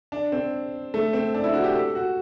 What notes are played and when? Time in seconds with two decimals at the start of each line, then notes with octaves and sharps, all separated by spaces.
0.12 D4
0.32 C4
0.94 A3
1.13 C4
1.34 D4
1.44 E4
1.54 F#4
1.64 G4
1.74 A4
1.95 F#4